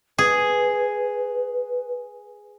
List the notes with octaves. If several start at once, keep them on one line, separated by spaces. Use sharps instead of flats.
G#4 B4